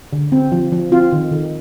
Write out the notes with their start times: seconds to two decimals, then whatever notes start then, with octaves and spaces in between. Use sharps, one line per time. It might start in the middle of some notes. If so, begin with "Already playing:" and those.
0.13 D3
0.32 C4
0.52 F3
0.72 F3
0.92 C4 F4
1.13 D#3
1.32 D#3